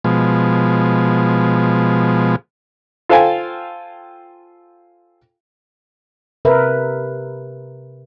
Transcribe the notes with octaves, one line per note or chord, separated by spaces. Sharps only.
B2 F3 G#3
F4 A4 C5 F5 G5 G#5
C3 A#4 B4 E5